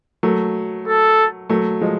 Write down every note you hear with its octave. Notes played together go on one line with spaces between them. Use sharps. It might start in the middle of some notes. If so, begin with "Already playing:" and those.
F#3 A3
A4
F#3 A3
F3 G#3